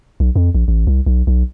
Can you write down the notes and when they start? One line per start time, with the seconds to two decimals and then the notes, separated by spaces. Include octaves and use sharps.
0.20 B1
0.36 F2
0.55 A#1
0.68 A1
0.87 C2
1.06 B1
1.27 B1